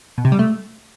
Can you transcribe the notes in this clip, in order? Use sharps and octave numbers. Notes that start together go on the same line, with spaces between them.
B2
C3
G3
A3